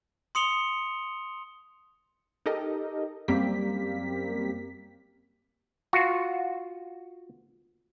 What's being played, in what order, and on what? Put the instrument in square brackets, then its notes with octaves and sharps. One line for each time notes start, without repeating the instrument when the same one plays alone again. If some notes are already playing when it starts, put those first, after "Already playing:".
[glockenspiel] C6 D#6 C#7 F7 G7
[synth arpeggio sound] D#4 G4 A4 A#4 D#5
F#2 G3 A#3 C4 G4 B6
[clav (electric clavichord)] F4 F#4